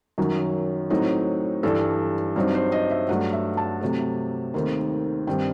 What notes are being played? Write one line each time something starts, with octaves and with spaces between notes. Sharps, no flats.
F#2 D#3 F#3
A2 F#3 C4 D#4
G2 E3 G3 A4
G2 F#3 C4 D#4
C5
D#5
E5
G2 F#3 A3 F#5
E5
A5
C3 F#3 A3
D#2 D#3 A3 C4 D#4
G2 D#3 G3 C4 D#4 G5